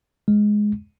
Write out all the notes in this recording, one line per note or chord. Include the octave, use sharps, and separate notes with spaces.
G#3